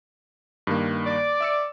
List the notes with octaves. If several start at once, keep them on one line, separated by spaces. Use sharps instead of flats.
G2 D#3 A#3
D5
E5 E6 C#7